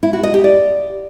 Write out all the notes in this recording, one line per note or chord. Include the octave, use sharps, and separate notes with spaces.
E4
F#4
D#5
G4
D5